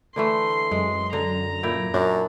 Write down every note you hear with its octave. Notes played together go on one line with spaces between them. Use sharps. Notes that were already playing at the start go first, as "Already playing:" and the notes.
D3 E3 A3 C6
F#2 G#3
D3 A#5
A#2 E4 G5
F#2 D4